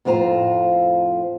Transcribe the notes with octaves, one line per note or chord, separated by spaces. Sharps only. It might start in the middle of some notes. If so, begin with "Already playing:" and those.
F2 A2 F4 C5 A#5